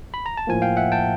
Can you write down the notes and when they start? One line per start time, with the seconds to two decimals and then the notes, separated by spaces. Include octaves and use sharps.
0.14 B5
0.26 A#5
0.37 A5
0.47 A2 F3 A#3 G#5
0.62 F5 G5
0.77 E5 F#5
0.92 G5 A5